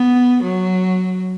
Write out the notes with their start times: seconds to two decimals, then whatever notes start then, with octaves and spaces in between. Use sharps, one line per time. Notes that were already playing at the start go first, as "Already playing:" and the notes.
Already playing: B3
0.43 F#3